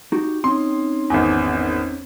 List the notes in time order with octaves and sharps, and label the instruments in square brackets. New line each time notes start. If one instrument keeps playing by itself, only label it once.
[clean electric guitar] D#4 F#4 G4
[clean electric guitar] C4 C#4 D#4 [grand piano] C6
[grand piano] G#1 E2